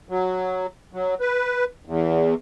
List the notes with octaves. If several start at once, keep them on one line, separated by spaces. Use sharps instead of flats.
F#3
F#3
B4
E2